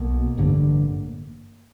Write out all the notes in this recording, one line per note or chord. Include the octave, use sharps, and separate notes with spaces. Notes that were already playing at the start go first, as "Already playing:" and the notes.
Already playing: B1 B2 A#3
A1 G2 D3